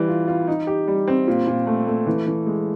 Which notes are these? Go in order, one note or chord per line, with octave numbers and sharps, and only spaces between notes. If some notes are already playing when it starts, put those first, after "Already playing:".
Already playing: E3 G3
F4
F4
D#4
G4
G3
C4
A#2
A#2
A3
A3
E3
E3
G#3